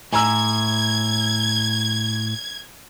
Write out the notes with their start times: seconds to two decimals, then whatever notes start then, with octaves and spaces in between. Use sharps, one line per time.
0.13 A2 G#5 A#5 E6 G#6